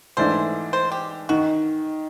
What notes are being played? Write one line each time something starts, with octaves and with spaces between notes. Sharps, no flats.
G#2 E3 A3 D4 C5
C5
G4
D#3 F#4